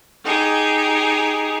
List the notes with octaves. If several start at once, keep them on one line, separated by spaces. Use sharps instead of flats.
D#4 G4 G#4